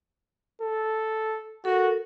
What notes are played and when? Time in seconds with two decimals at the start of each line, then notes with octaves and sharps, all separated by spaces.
0.62 A4
1.65 F#4 A4 A#4